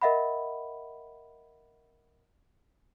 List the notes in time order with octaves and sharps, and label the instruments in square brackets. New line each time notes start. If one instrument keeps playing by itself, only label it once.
[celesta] A#4 D#5 E5 F#5 B5